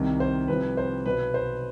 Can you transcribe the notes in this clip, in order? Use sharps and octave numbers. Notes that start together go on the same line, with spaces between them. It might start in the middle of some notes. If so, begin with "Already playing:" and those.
Already playing: C2 C3 D#3
C5
C2 C3 F3 B4
C5
B1 B2 B4
C5